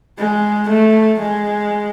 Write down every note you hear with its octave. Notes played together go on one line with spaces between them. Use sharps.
G#3
A3
G#3